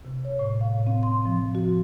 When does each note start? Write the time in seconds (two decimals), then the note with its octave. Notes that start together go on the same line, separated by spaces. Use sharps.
0.05 C3
0.25 C#5
0.39 A2
0.61 F5
0.87 C4
1.03 C6
1.26 F3
1.55 F#4